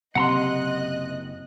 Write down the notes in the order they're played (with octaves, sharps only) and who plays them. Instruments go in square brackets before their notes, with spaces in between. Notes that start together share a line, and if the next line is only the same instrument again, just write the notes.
[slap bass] F#1 [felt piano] C3 [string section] D#5 F#6 [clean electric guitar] F#5 A#5 C6